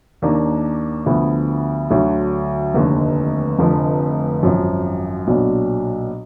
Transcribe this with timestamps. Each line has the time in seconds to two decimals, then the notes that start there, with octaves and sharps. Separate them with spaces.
0.22 D#2 D#3 A#3 D4
1.06 D2 D3 F3 B3
1.90 D2 D3 F#3
2.74 F1 D#2 D3
3.59 F1 F2 D3 F3
4.43 G#1 F#2 F3
5.27 B1 A#2 F#3 B3 D4